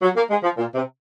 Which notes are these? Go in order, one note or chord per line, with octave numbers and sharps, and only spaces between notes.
F#3
A#3
G#3
F3
A#2
C3